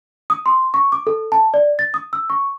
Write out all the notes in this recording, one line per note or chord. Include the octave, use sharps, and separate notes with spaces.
D#6
C6
C#6
D6
A4
A5
D5
A6
D#6
E6
C#6